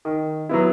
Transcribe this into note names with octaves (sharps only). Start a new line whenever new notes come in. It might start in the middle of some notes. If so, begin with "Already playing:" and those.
D#3
F#3 B3 E4